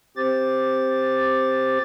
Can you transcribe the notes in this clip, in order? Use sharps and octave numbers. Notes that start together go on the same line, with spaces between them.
C4 G4 C5 D6 A6